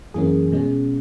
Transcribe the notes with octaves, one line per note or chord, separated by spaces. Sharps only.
F#2 E3 A#3 C#4 G#4
B2 G#3 C#4